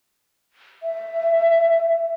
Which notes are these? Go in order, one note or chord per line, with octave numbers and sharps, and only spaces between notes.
E5